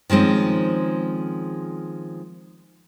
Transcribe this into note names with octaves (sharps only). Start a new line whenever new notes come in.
D#3 F3 G#3 C4 C#4